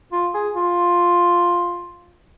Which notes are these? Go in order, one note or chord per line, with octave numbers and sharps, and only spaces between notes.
F4
G#4
F4